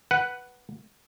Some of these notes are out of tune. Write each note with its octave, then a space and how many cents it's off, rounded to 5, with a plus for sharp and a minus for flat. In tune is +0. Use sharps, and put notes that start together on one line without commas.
B4 -5 F#5 +10